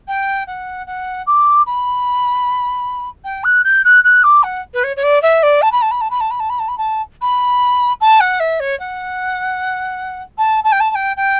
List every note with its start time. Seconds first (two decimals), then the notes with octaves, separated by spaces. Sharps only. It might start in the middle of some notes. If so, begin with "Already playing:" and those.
0.08 G5
0.47 F#5
0.87 F#5
1.26 D6
1.66 B5
3.24 G5
3.44 F#6
3.64 G6
3.84 F#6
4.04 F#6
4.23 D6
4.43 F#5
4.73 B4
4.83 C#5
4.96 C#5
5.03 D5
5.22 E5
5.43 D5
5.62 A5
5.72 B5
5.82 A5
5.91 B5
6.01 A5
6.10 B5
6.20 A5
6.30 B5
6.39 A5
6.50 B5
6.59 A5
6.68 B5
6.78 A5
7.21 B5
8.00 A5
8.20 F#5
8.40 E5
8.60 C#5
8.79 F#5
10.38 A5
10.64 A5
10.72 G5
10.80 A5
10.90 A5
10.95 G5
11.16 G5